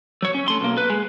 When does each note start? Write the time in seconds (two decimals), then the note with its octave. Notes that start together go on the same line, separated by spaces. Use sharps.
0.22 F#3 C#5
0.34 C#4
0.48 A3 C6
0.61 B1 A#3
0.77 B4
0.90 G#3